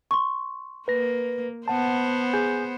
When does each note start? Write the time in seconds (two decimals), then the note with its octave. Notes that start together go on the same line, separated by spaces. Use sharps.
0.11 C6 C#6
0.88 A#3 B4 A#6
1.68 B3 C5 F#5 A5
2.33 G#4 G#5 G6